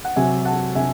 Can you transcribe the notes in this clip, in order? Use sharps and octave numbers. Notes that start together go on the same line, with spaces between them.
F#5
C3 F#3 E5 G#5
F#5 A5
C3 F#3 E5 G#5